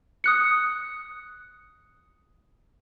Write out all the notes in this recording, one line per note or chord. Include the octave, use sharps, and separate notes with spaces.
D#6 F#6 C#7